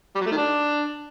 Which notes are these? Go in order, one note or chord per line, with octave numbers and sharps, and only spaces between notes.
G3
F#3
A3
D#3
D4